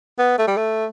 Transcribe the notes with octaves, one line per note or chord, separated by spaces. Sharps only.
B3
A3
G3
A3